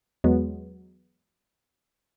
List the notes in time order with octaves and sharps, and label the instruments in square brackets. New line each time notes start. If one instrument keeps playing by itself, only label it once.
[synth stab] E2 F#3 G#3 B3